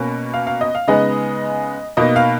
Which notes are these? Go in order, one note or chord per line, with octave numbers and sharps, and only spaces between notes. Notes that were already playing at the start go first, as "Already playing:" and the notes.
Already playing: B2 A#3 C#4
F5
F5
D#5
F5
C#3 G#3 B3 D#4 D#5
B2 A#3 D#4 D#5
F5